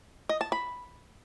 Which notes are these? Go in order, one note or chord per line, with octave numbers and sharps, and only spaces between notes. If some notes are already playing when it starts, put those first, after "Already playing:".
D#5
A5
B5